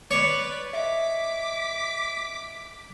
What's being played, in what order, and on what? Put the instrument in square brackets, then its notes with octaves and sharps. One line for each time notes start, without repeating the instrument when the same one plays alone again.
[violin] B4 D5 [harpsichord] C#5 [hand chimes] D6 D7
[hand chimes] D#5 E5 [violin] D6 B6